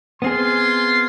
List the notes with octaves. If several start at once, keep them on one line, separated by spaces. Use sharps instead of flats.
B3 C4 F4 G#4 G#5 C6